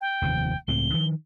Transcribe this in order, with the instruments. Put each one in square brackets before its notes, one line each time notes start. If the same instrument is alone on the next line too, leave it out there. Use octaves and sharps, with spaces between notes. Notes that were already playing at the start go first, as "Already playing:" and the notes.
[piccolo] G5
[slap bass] F1 D#2 F3
[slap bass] C#2 A2 C4 [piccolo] G7
[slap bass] D#3 F3